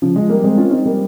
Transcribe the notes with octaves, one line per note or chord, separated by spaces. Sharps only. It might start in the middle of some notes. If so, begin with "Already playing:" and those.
C#3 F3
F3 G#3
G3 A#3
G#3 C4
C#4 F4
C4 D#4
G3 A#3